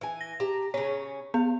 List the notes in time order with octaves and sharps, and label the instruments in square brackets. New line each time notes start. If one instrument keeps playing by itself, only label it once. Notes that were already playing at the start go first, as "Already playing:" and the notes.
[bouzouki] E3 G#5
[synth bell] A#6
[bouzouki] G4 A5 A#5
[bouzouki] C#3 C#4 [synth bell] C#5
[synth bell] B3 [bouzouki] F5